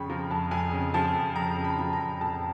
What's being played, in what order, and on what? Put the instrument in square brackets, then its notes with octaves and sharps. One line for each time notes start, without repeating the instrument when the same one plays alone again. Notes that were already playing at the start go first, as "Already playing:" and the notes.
Already playing: [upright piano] F2 C#3 B5 C#6
F3 A#5
F2 A5
F2 G#5
C#3
F3 A5
F2
F2 A#5
C#3
B5
F3
A#5
F2
F2 A5